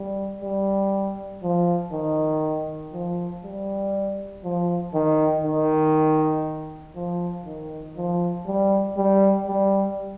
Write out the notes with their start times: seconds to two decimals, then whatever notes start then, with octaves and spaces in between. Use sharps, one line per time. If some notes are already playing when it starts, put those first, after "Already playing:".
Already playing: G3
0.42 G3
1.43 F3
1.92 D#3
2.93 F3
3.44 G3
4.44 F3
4.94 D#3
5.44 D#3
6.96 F3
7.46 D#3
7.97 F3
8.47 G3
8.97 G3
9.46 G3